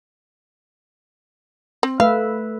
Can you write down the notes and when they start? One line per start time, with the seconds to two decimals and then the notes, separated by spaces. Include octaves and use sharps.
1.83 C4
2.00 A3 B4 E5 F5